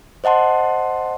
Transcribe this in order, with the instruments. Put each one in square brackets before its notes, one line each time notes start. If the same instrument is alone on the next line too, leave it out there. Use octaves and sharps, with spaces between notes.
[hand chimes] C5 D#5 F#5 A5 C6